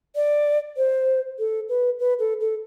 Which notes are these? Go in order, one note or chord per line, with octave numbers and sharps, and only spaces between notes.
D5
C5
A4
B4
B4
A4
A4